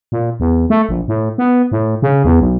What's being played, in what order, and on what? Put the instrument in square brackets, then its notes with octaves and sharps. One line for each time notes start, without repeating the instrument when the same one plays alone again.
[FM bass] A#2
E2
A3
A#1
A2
B3
A2
C#3
E2
B1